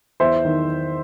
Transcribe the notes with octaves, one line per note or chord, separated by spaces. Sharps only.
E2 C5 E5
D#3